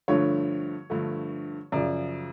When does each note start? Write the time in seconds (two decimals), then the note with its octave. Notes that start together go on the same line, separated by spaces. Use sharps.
0.08 G2 D3 F3 A3 C#5
0.90 G2 D3 F3 A3
1.72 F#2 C#3 F3 D5